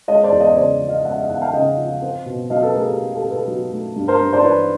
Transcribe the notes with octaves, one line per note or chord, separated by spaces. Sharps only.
G#3 C#5 D#5
C5 D5
E2
C#5 D#5
C#5
C#3 C5 D5
F3
D#5 F5
G#3 E5 F#5
D#5 F5
E2 E5 F#5
F5 G5
C#3 D#5 F5
F3
C4
B2
F#3 D#5 F5
A4 B4
A3 G#4 A#4
G4 A4
C4
G4 A4
B2
A4 B4
F#3
A3
G2
A#4 C5
G2
C5 D5
E3 B4 C#5